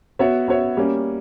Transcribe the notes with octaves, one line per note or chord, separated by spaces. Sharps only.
B3 F#4 C#5 E5
B3 F#4 C#5 E5
G3 A#3 C#4